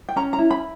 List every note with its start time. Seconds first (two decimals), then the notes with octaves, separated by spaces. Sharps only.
0.09 G5
0.16 C#4 A#5
0.33 A#5
0.38 E4
0.51 B5